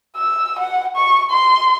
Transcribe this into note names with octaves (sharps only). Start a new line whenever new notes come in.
E6
F#5
C#6
C6